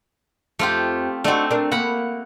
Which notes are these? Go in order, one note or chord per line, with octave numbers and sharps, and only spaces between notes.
F2 A3 F4 G4
A3 C4 D4 D#4 F#4
D4 A#4
A#3 F#5 B5